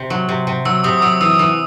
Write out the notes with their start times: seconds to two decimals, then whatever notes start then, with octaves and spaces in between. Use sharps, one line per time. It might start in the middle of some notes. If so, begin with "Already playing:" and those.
Already playing: C3
0.10 F#3
0.29 C3
0.47 C3
0.65 F#3 E6
0.84 C3 D#6
0.98 D#6
1.02 F#3 E6
1.21 E3 E6
1.39 E3